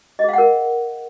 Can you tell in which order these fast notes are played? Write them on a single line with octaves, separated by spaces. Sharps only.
D#5 G#4 F5 F#5 A#4